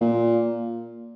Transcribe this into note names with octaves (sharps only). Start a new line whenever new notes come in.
A#2